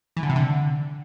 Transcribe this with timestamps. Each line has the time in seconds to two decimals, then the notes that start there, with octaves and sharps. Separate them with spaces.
0.17 E3
0.23 D3
0.29 C3
0.36 D3